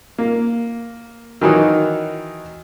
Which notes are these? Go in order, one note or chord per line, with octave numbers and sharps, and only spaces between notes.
A#3
D#3 E3 F#3 D#4